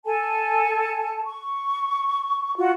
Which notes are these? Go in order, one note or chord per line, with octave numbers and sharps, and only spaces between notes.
A4 G#5 A5
C#6
F4 F#4